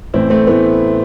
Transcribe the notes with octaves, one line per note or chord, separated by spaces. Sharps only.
A1 A2 E3 C4 E4
A3 C4
A2 E3 B3